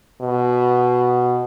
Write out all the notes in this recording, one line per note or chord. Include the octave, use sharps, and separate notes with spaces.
B2